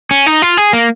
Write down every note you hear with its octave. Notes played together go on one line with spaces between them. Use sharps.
C#4
D#4
F4
G#4
A#3